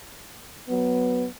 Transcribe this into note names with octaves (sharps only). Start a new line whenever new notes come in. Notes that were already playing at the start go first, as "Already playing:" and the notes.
F#3 B3